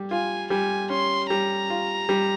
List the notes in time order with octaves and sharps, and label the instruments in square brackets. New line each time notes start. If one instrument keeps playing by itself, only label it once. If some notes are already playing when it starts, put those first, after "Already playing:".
Already playing: [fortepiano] G3
[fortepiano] F4 [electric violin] G#5
[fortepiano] G3 [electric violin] G#5
[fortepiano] C#4 [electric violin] C6
[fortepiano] G3 [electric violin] A#5
[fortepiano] F4
G3